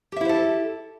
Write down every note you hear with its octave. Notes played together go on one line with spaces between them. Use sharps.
E4 G4 A4 C5 E5